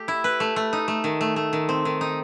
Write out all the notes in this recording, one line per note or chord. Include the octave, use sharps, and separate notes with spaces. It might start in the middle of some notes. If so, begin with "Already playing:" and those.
Already playing: A3 G4
E4
B4
A3
A3
D#4
A3
D#3
A3
A3
D#3
C4
D#3
D#4